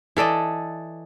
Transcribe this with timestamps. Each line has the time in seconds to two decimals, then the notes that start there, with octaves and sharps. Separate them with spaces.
0.17 E3 A4 D5 D#5